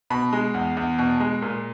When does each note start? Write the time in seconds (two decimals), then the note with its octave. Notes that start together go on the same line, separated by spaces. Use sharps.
0.10 B2 B5
0.33 G#3
0.54 E2
0.77 E2
0.98 B2
1.20 G#3
1.42 A#2